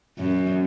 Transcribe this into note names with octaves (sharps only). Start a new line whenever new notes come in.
F#2